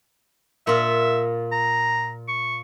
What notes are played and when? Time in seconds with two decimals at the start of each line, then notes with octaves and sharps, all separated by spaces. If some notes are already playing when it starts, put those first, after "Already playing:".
0.67 A#2 F4 E5
1.52 A#5
2.28 C#6